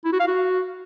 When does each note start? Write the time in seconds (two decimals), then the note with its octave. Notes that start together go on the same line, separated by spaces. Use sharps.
0.05 E4
0.12 F#4
0.20 F5
0.28 F#4